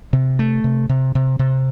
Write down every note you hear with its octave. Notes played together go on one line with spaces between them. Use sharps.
C3
A3
C3
C3
C3
C3